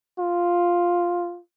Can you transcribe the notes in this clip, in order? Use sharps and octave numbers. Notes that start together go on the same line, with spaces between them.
F4